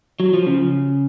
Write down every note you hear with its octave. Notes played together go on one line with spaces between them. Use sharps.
F#3
F3
C#3